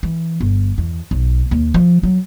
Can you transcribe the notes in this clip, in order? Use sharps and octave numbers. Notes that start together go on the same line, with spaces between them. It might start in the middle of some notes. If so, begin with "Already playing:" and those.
E3
G1
E2
B1
D#2
F3
F#3